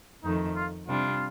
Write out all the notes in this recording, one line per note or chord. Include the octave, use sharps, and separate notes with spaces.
F2 D#3 A3 D#4
F4
C3 G3 D4 F4